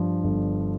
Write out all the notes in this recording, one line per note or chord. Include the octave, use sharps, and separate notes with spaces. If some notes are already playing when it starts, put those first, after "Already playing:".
Already playing: G2 F3
G1